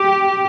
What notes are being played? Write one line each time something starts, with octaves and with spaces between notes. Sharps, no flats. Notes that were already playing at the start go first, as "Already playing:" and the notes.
Already playing: G4